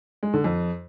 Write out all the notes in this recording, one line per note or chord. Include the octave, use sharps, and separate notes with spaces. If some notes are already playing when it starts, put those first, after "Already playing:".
G#3
D3
F2